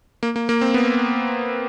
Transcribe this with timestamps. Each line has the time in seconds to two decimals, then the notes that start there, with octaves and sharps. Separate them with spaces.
0.23 A#3
0.36 A#3
0.49 A#3
0.61 C4
0.74 B3